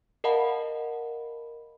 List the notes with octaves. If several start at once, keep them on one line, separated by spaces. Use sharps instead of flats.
A#4 D#5 F5 F#5 A5 B5